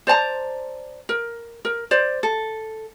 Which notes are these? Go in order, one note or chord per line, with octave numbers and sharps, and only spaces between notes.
C5 D5 A5 A#5
A#4
A#4
C5 D5
A4